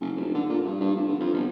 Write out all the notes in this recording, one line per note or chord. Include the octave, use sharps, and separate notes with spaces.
F#1
F1
D3
A#2
G2
G2
F1
D3
F2
G1